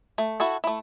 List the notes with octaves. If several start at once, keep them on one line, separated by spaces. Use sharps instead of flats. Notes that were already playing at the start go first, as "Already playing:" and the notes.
A3
E4 F#4 A4
A3 E4